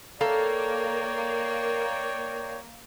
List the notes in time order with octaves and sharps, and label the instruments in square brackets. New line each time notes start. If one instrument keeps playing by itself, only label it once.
[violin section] A#3 [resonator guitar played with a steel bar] A4 A#4 F5 [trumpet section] C#5 D5 G5